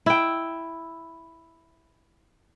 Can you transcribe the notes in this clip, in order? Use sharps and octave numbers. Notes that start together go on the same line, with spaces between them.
E4 G5